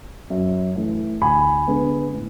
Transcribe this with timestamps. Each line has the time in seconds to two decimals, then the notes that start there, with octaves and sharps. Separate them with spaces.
0.30 F#2
0.76 E3 A3
1.22 D2 G#5 B5
1.68 D3 G#3 B3
2.13 A2